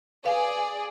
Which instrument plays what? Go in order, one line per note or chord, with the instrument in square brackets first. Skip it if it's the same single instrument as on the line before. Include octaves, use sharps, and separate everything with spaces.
[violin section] G#4 D5 [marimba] B4 F5